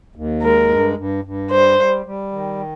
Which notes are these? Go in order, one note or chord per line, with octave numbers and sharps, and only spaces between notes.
D#2
G#3 A#4
G2
G2
G2
G3 C5
G3
G3
D#3